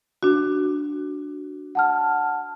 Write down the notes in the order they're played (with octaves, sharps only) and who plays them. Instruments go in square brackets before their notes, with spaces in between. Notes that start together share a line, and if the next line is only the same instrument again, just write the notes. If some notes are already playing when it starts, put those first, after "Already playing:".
[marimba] D4 F#4
[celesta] F#5 A5 F6